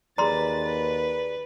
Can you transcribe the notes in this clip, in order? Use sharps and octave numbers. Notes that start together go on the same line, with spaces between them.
D#2 G#4 B4 D5 A#5 C6 A6
B4